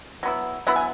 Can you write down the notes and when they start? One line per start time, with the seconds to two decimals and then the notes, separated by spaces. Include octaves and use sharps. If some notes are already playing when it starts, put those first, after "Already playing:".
0.23 F#3 B3 E4
0.67 F#3 B3 E4 F#5
0.76 G#5